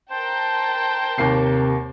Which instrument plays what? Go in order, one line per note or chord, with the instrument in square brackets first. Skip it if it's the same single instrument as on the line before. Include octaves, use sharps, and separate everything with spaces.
[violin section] A#4 G5 A5 [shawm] C5
[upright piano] D#2 A#3 C7 [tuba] C3